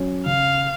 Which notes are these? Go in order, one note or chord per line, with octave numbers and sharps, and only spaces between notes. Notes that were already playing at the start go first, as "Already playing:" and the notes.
Already playing: F#3 C#4
C#3 F5